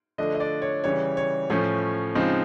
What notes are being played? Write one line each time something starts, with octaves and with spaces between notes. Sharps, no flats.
D3 F3 A3 D4 D#5
D#5
D5
C#5
C#3 E3 G3 C#5
C#5
A2 F3 A3 C#4 C#5
C#3 F3 G#3 C4 D#4